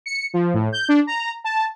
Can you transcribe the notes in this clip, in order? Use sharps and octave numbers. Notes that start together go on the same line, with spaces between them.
C#7
F3
A2
G6
D4
A#5
A5